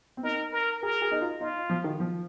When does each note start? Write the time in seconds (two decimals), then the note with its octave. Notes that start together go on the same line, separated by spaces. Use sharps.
0.17 C4
0.23 D#4 A#4
0.53 A#4
0.82 G#4 A#4
1.01 G#4
1.11 D#4
1.21 F4
1.41 D#4 F4
1.69 F3
1.84 D#3
2.00 F3